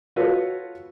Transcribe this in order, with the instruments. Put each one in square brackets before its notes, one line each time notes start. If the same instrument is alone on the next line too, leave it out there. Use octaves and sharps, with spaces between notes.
[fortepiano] F4 F#4 A4 B4 C#5